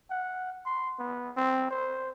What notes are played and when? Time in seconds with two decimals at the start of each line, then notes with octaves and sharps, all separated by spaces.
0.10 F#5
0.66 C6
0.99 B3
1.37 C4
1.71 C5